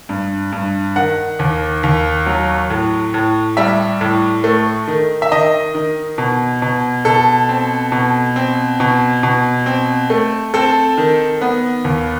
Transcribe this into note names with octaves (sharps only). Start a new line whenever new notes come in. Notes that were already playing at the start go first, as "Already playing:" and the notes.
G2
G2
D#3 F#5
D#2
D#2
F#3
A2
A2
G3 E5
A2
A3
D#3
E5
D#3 D#5
D#3
B2
B2
B2 A4
C4
B2
C4
B2
B2
C4
A3
C4 A4
D#3
B3
D#2